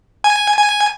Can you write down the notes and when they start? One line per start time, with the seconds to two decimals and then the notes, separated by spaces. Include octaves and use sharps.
0.24 G#5
0.57 G#5